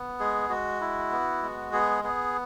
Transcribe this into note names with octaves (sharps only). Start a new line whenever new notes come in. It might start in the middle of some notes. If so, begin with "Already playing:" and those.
Already playing: B3
G#3 G#4
G#3 F#4
E4
B3
G#3
B3 G#4
B3 G#4